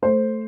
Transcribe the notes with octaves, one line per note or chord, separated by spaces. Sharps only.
A3 C5